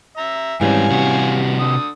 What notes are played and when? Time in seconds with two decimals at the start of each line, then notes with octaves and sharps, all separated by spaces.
0.17 E5 A#5
0.61 G#2 E3 G3 C4 C#4 F5 G#5
0.91 C3 F#4
1.59 D3 D#6